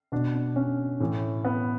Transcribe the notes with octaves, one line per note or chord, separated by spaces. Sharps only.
B2 D4
D4
C#4
A2 E3
B3